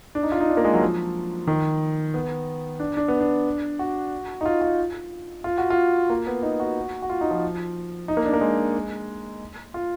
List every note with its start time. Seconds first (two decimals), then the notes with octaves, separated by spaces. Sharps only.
0.15 D4
0.23 D#4
0.32 F4
0.40 D#4
0.49 D4
0.57 A#3
0.65 G#3
0.74 F#3
0.81 F3
1.47 D#3
2.14 B3
2.80 D4
2.97 D4
3.08 B3
3.20 D4
3.79 F#4
4.41 D#4
4.46 F4
4.62 F4
5.44 F4
5.58 F#4
5.70 F4
6.10 A#3
6.27 B3
6.43 D#4
6.60 F#4
7.02 F#4
7.10 F4
7.21 D#4
7.31 F3
8.08 D#4
8.17 A#3
8.25 D4
8.33 A#3
8.41 G#3
9.74 F4